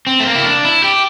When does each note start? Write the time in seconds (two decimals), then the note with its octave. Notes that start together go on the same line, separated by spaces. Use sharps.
0.07 C4
0.20 A3
0.26 A#3
0.35 E4
0.45 D4
0.65 E4
0.84 G4